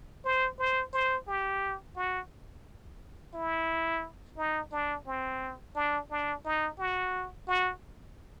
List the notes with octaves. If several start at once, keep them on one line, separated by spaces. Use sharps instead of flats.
C5
C5
C5
G4
F#4
E4
D#4
D4
C4
D4
D4
D#4
F#4
F#4